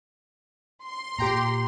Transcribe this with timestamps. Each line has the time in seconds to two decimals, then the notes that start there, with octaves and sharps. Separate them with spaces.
0.85 C6
1.19 A#2 G4 G5 A#5